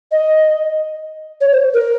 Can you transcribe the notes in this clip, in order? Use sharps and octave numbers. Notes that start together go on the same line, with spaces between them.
D#5
C#5
C5
A#4